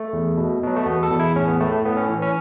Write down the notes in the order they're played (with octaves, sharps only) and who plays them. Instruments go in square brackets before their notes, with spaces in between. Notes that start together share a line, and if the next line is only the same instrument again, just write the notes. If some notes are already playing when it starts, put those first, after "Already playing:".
Already playing: [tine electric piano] A3
E2
B2
B2 F#3
A3
E2 B3
A4
E2
E4
A2 C#4
B3
A2 A3
A3
A2 B3
C#4
E3
C#4